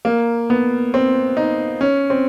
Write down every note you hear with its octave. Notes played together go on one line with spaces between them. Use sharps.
A#3
B3
C4
D#4
C#4
C4